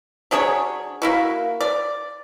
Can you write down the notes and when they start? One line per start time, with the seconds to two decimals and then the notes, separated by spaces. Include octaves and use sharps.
0.31 F#3 D4 G#4 C#5
1.02 A#3 E4 F#4
1.61 D5